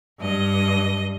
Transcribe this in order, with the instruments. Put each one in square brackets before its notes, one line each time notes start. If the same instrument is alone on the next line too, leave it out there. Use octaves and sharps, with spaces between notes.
[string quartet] G2 D#5